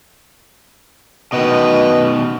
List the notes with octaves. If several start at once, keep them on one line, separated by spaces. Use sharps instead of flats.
B2 D#3 B4 D#5